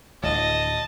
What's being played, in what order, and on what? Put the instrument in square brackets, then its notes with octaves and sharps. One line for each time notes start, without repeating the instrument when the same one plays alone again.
[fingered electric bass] D1 [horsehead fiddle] D#5 [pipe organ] A5